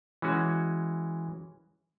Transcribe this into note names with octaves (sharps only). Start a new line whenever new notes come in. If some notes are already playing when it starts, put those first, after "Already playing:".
E3 G#3 C#4 F#4